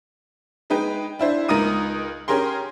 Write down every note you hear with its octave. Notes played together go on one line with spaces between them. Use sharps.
G#3 D#4 B4 G5
D4 E4 C5
C#2 D#4 A#4 D#6 D#7
C#4 G4 G#4 A#4 C6